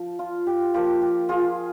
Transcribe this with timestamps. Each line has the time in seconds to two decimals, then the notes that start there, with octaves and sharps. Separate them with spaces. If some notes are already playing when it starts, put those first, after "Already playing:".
Already playing: F3
0.19 F4
0.47 G4
0.74 F3 A#3 F4 G4
1.02 G4
1.29 F4 G#4